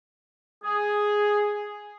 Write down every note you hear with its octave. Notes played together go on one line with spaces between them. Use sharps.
G#4